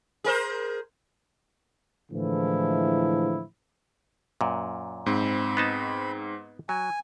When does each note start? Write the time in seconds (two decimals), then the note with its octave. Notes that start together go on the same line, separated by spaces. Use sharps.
0.24 G#4 A#4 C5
2.12 A2 D3 E3 F3 G#3 E4
4.41 F#2 A#2
5.06 G#2 C4 B5
5.57 B3 D#4 A5
6.69 F#3 G#5